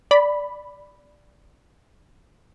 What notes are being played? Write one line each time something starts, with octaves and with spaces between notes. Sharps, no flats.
D5 B5